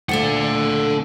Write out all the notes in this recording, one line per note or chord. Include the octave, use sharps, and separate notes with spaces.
D2 A#2 A3 D4 F#5